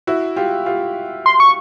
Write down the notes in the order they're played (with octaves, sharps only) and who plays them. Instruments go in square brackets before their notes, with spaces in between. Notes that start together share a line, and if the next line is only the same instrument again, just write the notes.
[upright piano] E4 F#4
F4 G4
F4 G4
[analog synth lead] C6
C#6